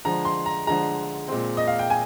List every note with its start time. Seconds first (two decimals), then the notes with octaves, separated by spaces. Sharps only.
0.05 D3 F3 G#3 A#5
0.25 C6
0.46 A#5
0.67 D3 F3 G#3 A#5
1.28 A#2 G#3 C4
1.57 D#5
1.68 F5
1.79 G5
1.90 G#5